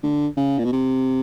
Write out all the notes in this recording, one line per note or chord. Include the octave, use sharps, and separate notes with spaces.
D3
C#3
A#2
B2
C3